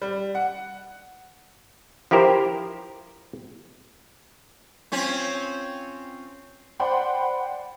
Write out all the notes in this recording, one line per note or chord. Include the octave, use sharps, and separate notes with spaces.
G3
F#5
F3 E4 G4 A#4 C5
C4 C#4 F4
C5 D5 F#5 G5 B5 C6